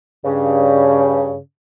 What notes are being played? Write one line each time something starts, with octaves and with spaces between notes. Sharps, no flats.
G2 C#3